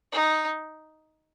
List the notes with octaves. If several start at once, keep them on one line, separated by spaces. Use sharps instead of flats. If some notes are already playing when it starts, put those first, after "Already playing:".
D#4